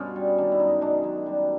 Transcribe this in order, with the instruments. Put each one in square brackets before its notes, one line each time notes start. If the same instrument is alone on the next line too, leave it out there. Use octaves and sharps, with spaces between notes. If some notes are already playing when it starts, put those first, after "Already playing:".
Already playing: [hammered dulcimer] G2 B2 C#4 F4
G3
D#3 D4
E4
F#2 D#4
G#3 D4
F#2
G3